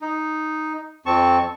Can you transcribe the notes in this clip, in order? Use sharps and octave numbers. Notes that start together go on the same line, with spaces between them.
D#4
F2 C4 A5 C#6